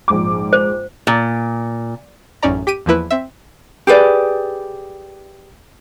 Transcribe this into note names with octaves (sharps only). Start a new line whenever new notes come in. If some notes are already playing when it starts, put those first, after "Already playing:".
A#1 G#2 D6
C5
A#2
A1 F#2 C#4 D#4 D5 A#5
G4 B6 D7 D#7
E2 F3 A#3 E4 B4
C4 E5
G4 G#4 B4 D5